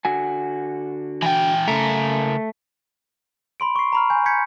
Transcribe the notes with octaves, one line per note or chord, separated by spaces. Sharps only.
D3 F#4 G#5
E3 G5
C#3 A3 A#4
B5 C6 D7
C#6 C7
A#5 B5 F6
G#5 G6
G6 G#6 B6 C#7